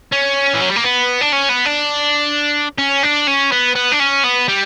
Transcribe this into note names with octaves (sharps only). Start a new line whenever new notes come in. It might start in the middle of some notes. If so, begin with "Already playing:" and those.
C#4
E3
F#3
G3
A#3
B3
D4
C#4
B3
D4
C#4
D4
C#4
B3
B3
D4
C#4
B3
G3